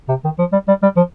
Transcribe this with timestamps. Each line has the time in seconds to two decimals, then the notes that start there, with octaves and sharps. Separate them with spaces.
0.09 C3
0.24 D#3
0.39 F3
0.52 G3
0.68 G3
0.83 G3
0.96 F3